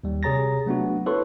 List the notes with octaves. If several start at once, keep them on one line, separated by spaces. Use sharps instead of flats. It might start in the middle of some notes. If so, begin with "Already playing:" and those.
D#2 G3
C3 G#4 C#5 A#5 A6 A#6
F#3 A3 B3 D4 F#4
E4 A4 B4 C#5 C6 C#6